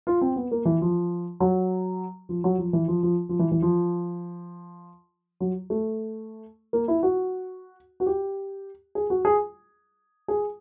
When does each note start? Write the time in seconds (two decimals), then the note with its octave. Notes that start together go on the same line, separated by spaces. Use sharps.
0.07 F4
0.21 C4
0.36 B3
0.51 A#3
0.65 E3
0.81 F3
1.40 F#3
2.29 F3
2.44 F#3
2.58 F3
2.73 E3
2.88 F3
3.03 F3
3.29 F3
3.39 E3
3.51 E3
3.62 F3
5.40 F#3
5.70 A3
6.73 A#3
6.88 E4
7.03 F#4
8.00 F#4
8.06 G4
8.95 G#4
9.10 F#4
9.25 G#4
10.28 G#4